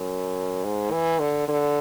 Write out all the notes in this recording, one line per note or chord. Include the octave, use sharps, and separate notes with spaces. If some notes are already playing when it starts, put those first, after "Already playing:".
Already playing: F#2
G#2
E3
D3
D3